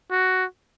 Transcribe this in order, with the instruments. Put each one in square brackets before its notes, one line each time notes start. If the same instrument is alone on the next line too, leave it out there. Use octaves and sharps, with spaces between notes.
[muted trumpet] F#4